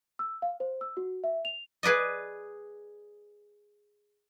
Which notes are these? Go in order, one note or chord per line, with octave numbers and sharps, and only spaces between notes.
E6
F5
C5
E6
F#4
E5
F7
G#4 B4 D5 D#5